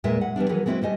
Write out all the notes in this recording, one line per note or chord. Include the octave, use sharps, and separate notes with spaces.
E2 A#2 G#3 E4 D5 E5
F#5
E3 G3 B3 D4
D#3 E3 F#3 E4 G#4
G#3 B3 C4 E4 F#4 B4
G3 A3 D#5 G#5